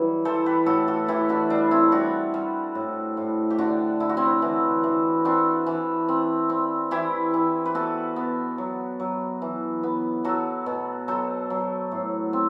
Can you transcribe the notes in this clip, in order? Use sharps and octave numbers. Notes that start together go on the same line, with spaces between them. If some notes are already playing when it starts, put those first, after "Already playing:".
Already playing: E3 F#3 G3
E3 A4 C5
G4 B4
A2 F#4 A4
F#4 A4
E3 E4 G4
D4 F#4
G3 D4
C4 E4
G3 D4 F#4
G3
A2
A2
G4
D3 D4 F#4
D3 E4
F#4
C4 E4
E3
E3
C4 D4 F#4
E3
C4
C4
E3 E4 G4
E3
B4
B3 F#4 A4
B3
F#3
F#3
E3
B3
F#3 F#4 A4
B2
F#3 A4 C5
F#3
A2
C4